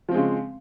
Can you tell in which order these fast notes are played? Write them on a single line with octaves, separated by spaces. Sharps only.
F3 C4 G#3 C#3